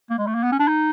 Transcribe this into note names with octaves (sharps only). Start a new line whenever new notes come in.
A#3
G#3
A3
A#3
B3
C#4
D4
D#4